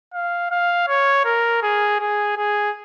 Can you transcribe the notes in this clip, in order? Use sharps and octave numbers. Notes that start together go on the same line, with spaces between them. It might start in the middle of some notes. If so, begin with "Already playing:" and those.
F5
F5
C#5
A#4
G#4
G#4
G#4